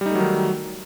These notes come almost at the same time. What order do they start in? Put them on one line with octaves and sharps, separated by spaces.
G3 D#4 A3 F#3 D#3